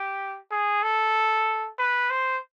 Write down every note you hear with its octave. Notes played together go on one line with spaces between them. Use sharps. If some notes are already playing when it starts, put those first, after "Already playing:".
Already playing: G4
G#4
A4
B4
C5